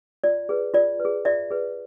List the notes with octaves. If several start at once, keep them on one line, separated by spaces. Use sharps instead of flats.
F4 D5
G#4 B4
F4 D5
B4
G#4
F4 D5 E5
G#4 B4